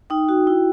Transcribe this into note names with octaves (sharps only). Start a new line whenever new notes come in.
D#4 G5
F#4
E4